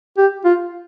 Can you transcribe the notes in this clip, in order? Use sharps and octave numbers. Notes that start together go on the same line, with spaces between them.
G4
F4